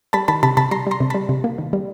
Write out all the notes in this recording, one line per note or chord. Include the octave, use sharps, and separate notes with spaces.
G3 A5 B5
D#3 A5 B5
C3 A5 B5
C3 A5 B5
G3 A#5 C6
G3 A#5 C6
C3
G3 A5 B5
C3
A#3
D#3
G3